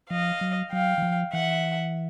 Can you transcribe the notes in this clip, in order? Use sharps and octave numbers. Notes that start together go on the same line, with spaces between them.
F3 D#5 F5
F#3
F#3 F5 G5
E3
F3
E3 E5 F#5